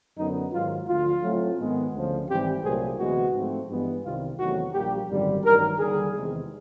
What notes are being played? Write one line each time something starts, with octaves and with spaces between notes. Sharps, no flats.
F#2 D3 F#3 B3 D#4
G#2 D#3 F#3 F4
D2 D3 F3 F4
A2 F#3 A3 C4
G#2 D#3 G#3 B3
D2 C#3 F3
G#1 G#2 E3 G3 C4 G4
C2 A#2 F#3 A3 C4 G#4
D2 C3 E3 G#3 B3 F#4
G#2 F3 A3 C4
G2 E3 G#3 B3
C2 C3 D#3 G3 F4
E2 C3 D#3 F#3 A3 F#4
A#1 A#2 G3 A#3 G4
G#1 F#2 D3 G3
A1 G2 D#3 F#3 A#4
D#2 D3 G3 G#4
E2 C3 D#3 G#3